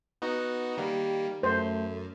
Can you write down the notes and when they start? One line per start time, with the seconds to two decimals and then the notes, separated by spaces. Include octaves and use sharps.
0.22 B3 D#4 F#4
0.78 D#3 G3 A#3 G4
1.43 F#2 A3 C5